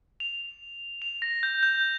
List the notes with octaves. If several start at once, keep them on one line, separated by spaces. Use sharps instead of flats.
F7
F7
A#6
G6
G6